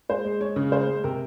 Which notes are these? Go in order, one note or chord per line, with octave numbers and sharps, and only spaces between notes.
G#3 C5
G#3
G#3 C#5
C#3
G#3 C5
G#3
C3 A#4